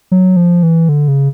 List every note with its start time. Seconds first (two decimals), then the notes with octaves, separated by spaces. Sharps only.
0.12 F#3
0.37 F3
0.63 E3
0.89 D3
1.08 C#3